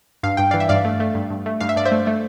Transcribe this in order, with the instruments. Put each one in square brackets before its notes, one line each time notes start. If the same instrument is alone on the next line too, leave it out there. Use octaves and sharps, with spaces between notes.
[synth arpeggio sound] G2 F5
G2 G5
E3 D5 F5
E5
G2 D5 F5
A3
A3
G2
G2
A3
G2 F5
E5
G2 D5
C5 E5
A3
A3